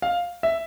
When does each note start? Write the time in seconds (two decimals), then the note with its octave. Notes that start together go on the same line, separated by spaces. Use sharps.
0.02 F5
0.43 E5